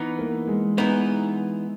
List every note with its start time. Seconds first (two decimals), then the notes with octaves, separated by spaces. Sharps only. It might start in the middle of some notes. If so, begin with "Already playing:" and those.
Already playing: E3 B3 D#4
0.19 A#3
0.48 G#3
0.78 E3 B3 D#4